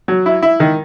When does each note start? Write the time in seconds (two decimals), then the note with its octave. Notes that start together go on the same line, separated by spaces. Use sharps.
0.08 F#3
0.26 E4
0.42 E4
0.60 D#3